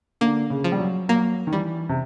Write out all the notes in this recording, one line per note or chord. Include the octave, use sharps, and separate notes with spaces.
D3 A#3
C#3
F3
G3
F#3
F#3 A#3
D#3
E3 G3
C3